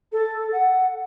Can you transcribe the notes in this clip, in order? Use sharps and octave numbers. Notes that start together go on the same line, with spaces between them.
A4
F#5